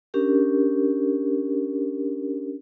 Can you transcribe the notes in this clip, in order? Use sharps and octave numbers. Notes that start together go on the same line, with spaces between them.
C#4 D4 G4 A#4